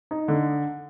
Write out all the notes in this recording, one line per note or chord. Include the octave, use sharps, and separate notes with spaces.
D#4
D3